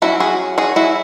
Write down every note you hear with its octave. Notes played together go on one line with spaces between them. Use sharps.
F#3 A3 C#4 E4 F#4
F#4 G#4
F#4 G#4
E4 F#4